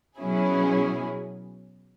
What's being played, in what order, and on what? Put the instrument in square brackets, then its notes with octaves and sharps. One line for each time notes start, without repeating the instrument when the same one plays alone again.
[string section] B2 F#3 C#4 E4 G#4